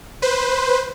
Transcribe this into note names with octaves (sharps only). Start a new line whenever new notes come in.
B4 C5